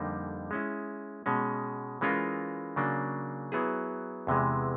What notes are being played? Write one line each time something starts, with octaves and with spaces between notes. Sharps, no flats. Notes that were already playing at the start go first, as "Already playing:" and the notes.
Already playing: F2 D3 G3 A#3 D#4
G#3 C#4 E4
B2 G#3 C#4
E3 G#3 C#4 F4 A#4
C#3 F#3 A#3 D4
F#3 B3 E4 G#4
E2 C3 E3 G#3